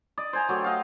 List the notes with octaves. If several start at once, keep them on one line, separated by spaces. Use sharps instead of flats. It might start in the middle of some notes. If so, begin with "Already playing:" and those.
D5 D#5
C5 G#5 A#5
F#3 A3 G4
D#5 F5